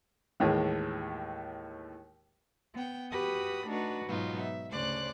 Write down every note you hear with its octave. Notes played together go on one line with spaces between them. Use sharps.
D#2 A2 E3 G#3
B3 G5
F#4 G4 B4 B5 D#6
A3 D4 D#4 F#4 B4
G#2 B2 F#3 B3 D#4 F4
E5
D2 C#3 C5 D5 D6 F#6